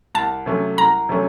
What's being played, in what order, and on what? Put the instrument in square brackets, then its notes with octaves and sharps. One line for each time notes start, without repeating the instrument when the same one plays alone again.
[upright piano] C2 [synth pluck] A5
[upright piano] C3 F#3 A3 C#4
[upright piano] C2 [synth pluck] A#5
[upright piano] C3 F#3 A3 C#4